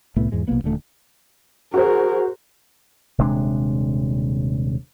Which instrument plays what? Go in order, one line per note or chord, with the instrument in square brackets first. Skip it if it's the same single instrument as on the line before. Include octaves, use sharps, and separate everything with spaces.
[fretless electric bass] C2 A2 A3 B3
E2 G#2 G#3
B1 C3 A#3 B3
D#1 D3 A3
[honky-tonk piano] F#4 C5 [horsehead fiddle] G#4 A#4
[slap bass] D#1 C3 G#3 D4